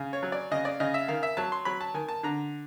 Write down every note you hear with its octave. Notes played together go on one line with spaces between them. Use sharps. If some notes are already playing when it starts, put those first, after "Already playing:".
Already playing: C#3
C#5
F#3
D5
C#3 D#5
D5
C#3 D#5
E5
D#3 F5
E5
F#3 A5
C6
F#3 B5
A5
D#3 G#5
A5
D3 A#5